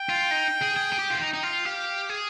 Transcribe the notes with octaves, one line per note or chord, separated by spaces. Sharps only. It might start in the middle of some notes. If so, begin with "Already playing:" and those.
Already playing: G5
F4
D#4
G#4
G#4
G#4
G4
F4
D#4 G5
D#4
F4
G4 F5
G#4